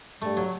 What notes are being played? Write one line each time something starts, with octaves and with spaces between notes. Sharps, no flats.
G2 G3 A3
F#3